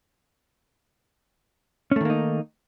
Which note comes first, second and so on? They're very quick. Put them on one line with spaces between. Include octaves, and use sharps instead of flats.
C#4 A3 D#3 A#3 D#4